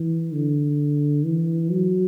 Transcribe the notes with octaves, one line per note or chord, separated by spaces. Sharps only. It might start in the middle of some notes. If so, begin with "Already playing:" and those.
Already playing: E3
D3
E3
F#3